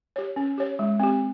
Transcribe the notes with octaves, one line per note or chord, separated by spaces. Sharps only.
G4 C#5
C#4
G4 C#5
G#3
C4 G4